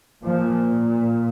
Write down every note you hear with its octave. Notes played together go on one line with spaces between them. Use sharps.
A#2 F3